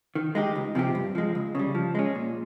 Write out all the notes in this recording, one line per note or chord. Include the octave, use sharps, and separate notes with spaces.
D#3
G#3 D#4 G4
C#2
C3 F3 C4 G4
G2
F3 G#3
C#2
C#3 G3
F3
G#3 C#4
A#2